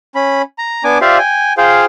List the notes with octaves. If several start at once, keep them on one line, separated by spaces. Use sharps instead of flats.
C#4 B5
A#5
B3 D4 G#5 D6
F4 G4 C5 D5 E5 F5
G5 G#5
F4 G#4 C5 F5 G5